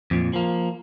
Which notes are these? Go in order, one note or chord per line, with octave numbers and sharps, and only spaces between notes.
F2 A#2
F3 A#3